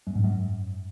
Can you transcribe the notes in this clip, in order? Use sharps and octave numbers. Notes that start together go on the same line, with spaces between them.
F#2
G#2
F#2